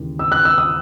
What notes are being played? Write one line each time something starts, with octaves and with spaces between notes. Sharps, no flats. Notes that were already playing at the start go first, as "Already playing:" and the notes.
Already playing: D#2 C#3 E3 G#3
E6
F#6
E6
D#6